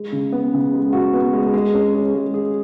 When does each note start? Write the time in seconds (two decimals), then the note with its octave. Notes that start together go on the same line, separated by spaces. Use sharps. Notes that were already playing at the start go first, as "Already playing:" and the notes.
Already playing: G#3
0.12 C#3
0.33 B3
0.54 C#3
0.74 G#3
0.93 F#4
1.14 B3
1.33 G#3
1.54 G#3
1.74 C#4
1.94 G#4
2.14 G#3
2.34 G#4